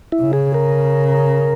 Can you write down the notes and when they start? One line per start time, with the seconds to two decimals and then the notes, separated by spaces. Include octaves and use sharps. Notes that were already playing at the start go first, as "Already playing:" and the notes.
0.12 E4
0.22 C#3
0.33 G#4
0.54 A#4